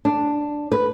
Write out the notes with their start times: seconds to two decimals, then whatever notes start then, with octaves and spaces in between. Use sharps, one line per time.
0.05 D4
0.72 B4